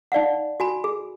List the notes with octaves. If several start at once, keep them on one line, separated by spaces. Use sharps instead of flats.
D#4 D5 F5 F#5
F#4 G#5 B5
G#4